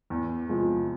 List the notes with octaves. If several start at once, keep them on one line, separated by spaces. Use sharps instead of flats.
E2
C3 F3 G#3